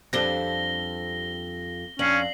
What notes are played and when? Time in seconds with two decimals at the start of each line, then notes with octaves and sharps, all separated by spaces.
0.13 F2 G3 C4 D4 A4 A#6 G7
1.99 F2 C#4 D4 C7 F#7